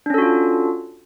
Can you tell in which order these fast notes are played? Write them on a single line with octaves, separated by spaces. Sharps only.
D4 C#4 A4 F#4 F4